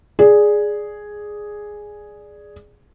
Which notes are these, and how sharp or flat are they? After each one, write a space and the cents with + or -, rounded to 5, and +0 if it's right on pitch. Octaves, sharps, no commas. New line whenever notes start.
G#4 +0 D5 +0